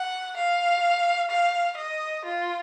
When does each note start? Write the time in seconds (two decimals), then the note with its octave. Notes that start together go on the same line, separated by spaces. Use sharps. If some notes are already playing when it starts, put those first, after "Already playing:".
Already playing: F#5
0.36 F5
1.30 F5
1.77 D#5
2.24 F4